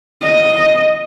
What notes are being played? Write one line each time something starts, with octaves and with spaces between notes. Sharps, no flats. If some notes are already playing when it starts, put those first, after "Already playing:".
D#5